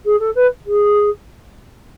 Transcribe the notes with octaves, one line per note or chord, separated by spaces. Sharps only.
G#4
A4
B4
G#4